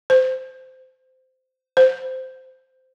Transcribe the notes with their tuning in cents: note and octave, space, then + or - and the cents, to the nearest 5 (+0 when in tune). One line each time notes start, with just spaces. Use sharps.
C5 -15
C5 -10